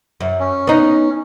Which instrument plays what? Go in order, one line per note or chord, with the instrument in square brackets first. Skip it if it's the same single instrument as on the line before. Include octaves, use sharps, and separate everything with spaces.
[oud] F#2
[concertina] C#4
[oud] B3 D#4